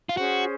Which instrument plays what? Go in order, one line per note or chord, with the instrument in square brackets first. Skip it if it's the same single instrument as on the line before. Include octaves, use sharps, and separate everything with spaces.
[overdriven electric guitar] F4
[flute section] C#4 G#4 C5 [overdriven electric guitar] F#4